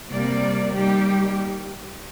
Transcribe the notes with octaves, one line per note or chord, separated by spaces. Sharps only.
C3 G3 A#3 D5
D#3 G3 A#3 G4